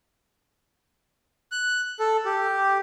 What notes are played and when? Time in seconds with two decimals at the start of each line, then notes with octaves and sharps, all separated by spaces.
1.52 F#6
2.00 A4
2.25 G4